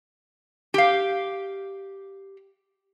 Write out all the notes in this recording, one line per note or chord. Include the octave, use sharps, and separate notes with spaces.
G4 F5